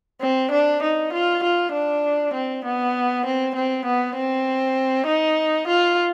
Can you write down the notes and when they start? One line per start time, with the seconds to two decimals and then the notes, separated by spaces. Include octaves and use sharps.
0.21 C4
0.51 D4
0.83 D#4
1.13 F4
1.44 F4
1.73 D4
2.34 C4
2.65 B3
3.26 C4
3.55 C4
3.85 B3
4.16 C4
5.07 D#4
5.67 F4